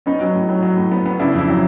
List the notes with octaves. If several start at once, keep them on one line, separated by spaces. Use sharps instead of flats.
B3 C#4 D#4
F#3
A2
F#3
F#3
A2
B3
B3
C#3 D4 E4
F2 D4 E4
F#3